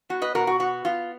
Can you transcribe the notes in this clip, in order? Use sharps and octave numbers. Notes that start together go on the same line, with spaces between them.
B3 F#4
B4 D#5
B2 F#4 A#4
F#4
B3 F#4
B3 F4